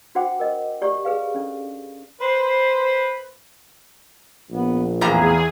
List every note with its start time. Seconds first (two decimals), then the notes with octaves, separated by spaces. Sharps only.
0.15 D4 F#4 C5 F#5 G5 D6
0.39 A#4 D#5
0.82 G4 D5 C#6
1.05 G#4 B4 F5
1.34 C#4 D4 A4
2.21 B4 C5
4.51 A#1 B3
5.01 E2 A2 E3 A#3 G#4 A#5